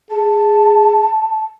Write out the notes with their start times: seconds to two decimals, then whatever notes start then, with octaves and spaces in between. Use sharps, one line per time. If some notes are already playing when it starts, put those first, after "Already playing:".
0.10 G#4 A5